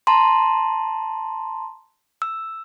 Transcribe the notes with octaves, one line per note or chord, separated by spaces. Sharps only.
A5 A#5 C6
E6